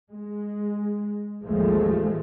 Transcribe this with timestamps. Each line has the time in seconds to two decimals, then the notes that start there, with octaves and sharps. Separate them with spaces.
0.11 G#3
1.44 A1 D#2 F3 G#3 A3